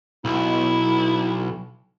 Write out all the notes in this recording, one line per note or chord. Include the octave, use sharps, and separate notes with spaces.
B1 E4